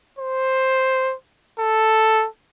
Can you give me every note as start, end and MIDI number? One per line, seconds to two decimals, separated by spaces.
0.19 1.14 72
1.59 2.26 69